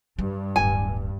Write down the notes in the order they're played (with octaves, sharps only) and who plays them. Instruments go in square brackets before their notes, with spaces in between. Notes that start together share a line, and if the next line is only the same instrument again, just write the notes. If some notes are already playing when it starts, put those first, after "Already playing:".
[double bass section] G2 [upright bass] G3
[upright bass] D1 G1 [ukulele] G#5